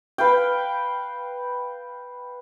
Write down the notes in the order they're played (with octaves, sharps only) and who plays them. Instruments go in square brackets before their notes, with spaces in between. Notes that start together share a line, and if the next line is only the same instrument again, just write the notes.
[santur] B4 F5 G5